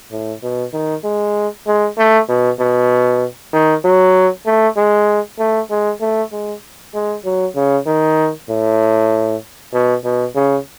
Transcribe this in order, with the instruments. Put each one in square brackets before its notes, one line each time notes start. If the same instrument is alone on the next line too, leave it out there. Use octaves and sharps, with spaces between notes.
[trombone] A2
B2
D#3
G#3
G#3
A3
B2
B2
D#3
F#3
A3
G#3
A3
G#3
A3
G#3
G#3
F#3
C#3
D#3
A2
B2
B2
C#3